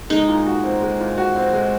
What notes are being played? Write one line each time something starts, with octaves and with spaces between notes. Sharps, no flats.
G#3 D#4
A#2
F#4
C4
G#3
A#2
F#4
C4
G#3